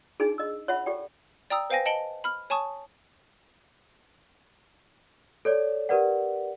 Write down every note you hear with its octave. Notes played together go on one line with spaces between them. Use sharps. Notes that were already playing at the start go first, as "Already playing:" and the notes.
D4 D#4 G#4
D#5 E6
C#5 E5 F#5 B5
G4 A4 D5 G5
D5 G5 A#5 D#6 E6
B4 C5 F5 G5 G#5 A#6
D#5 A5 C#7 D7 F#7 G7
B5 F6
C#5 G#5 A5 C#6 D#6
A4 C#5 D5
G4 A#4 B4 D5 F#5